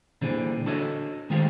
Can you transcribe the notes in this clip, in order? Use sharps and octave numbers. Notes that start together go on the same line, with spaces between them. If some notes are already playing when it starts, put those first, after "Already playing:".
A#2 D3 E3 G3 C4 G#4
D4 F#4 A4 C#5 D#5
D#3 G#3 A3 C4 F4 G4